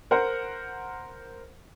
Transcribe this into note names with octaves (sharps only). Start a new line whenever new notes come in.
A#4 C5 F#5